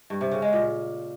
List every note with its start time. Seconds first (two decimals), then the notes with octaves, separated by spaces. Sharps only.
0.10 G2
0.21 C3
0.31 C#3
0.42 G#3
0.53 A#2